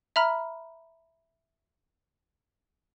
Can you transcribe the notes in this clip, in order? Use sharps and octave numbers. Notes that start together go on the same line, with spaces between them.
E5 A#5 B5 F6